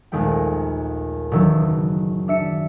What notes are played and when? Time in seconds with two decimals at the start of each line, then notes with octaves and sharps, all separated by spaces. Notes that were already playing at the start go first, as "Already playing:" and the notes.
0.12 A#1 D#2 G#3 A3 G5
1.31 E1 D#3 F#3 E6
1.60 F#1
2.28 D4 E5 C#7